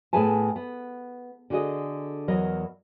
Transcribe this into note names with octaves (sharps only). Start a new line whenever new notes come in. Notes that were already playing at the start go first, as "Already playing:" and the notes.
A2 B3 G#4 B4 G#5 A5
B3
D3 F#4 G#4 D#5
E2 F#3 A#4 D#5